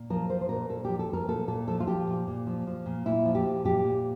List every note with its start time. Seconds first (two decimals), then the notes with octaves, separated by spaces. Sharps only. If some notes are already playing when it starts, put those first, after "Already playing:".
Already playing: A#2
0.10 F3 A#4
0.30 F3 C5
0.41 C5
0.49 A#2 A#4
0.69 A#2 A4
0.85 F3 G4
0.99 A4
1.09 F3 A#4
1.28 A#2 A4
1.48 A#2 A4
1.67 F3 A4
1.80 F4
1.87 F3 G4
2.07 A#2
2.27 A#2
2.47 F3
2.67 F3
2.86 A#2
3.06 A#2 E4
3.25 F3
3.35 G4
3.45 F3
3.64 A#2 G4
3.85 A#2